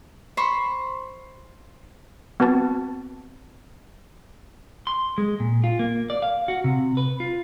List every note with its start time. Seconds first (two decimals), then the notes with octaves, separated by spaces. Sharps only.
0.37 C5 B5 C#6
2.40 B3 C4 F#4 B4 A5 A6
4.87 C6
5.18 G#3
5.40 A#2
5.64 F4
5.79 A#3
6.10 D5
6.22 F5
6.48 F#4
6.64 C3
6.97 B4
7.20 F4